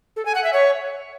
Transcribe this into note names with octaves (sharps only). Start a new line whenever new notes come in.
A4
G#5
F#5
E5
C#5